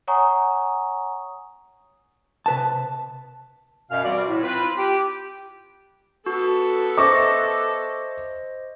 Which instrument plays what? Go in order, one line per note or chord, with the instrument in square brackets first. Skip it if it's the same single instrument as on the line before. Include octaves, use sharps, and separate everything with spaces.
[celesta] C#5 F#5 G#5 A#5 C#6 D#6
[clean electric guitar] C3 B4 A5
[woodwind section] F#2 B2 F5
E3 G3 C4 F#4 D5
A2
C4 F4 B4
G4
[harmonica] B3 A4 [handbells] F#4
[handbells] C5 D#5 A#6 [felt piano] E5 C#6 D6